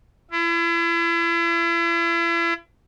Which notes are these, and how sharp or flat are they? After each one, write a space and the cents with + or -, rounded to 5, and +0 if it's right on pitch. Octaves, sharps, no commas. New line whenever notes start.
E4 +40